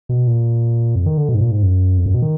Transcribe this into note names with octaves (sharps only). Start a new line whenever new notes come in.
B2
A#2
F2
D#3
D3
B2
G#2
A#2
G#2
F#2
F2
F#2
B2
D#3